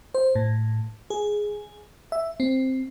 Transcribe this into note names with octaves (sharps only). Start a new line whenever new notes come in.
C5
A2
G#4
E5
C4